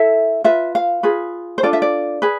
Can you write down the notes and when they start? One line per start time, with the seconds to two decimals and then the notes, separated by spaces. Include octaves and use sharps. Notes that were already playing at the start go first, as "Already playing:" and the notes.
Already playing: E4 A4 E5
0.44 F4 B4 E5
0.75 F5
1.03 F4 G#4 B4
1.58 C5
1.63 D4 F4 A4 D5
1.73 E5
1.82 D5
2.22 G#4 B4